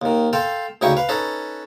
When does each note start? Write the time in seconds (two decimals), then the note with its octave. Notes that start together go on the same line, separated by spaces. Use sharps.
0.02 D#2 D#3
0.33 A4 F5 G5 C6
0.81 D2 C#3 D#4 E4 G5 C#6
0.97 B4 F5
1.09 C#4 D#4 A4 B4